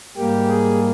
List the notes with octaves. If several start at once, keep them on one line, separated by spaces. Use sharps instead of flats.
G#2 G3 A#3 G4
G#4